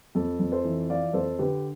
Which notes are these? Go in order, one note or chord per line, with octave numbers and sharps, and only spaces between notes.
F2 A4
F2
A4 C5
E3
F3 D5 F5
F2 A4 C5
D3 G4 B4